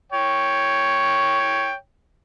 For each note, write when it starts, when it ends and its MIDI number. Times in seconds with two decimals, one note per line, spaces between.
0.12 1.73 73
0.12 1.73 79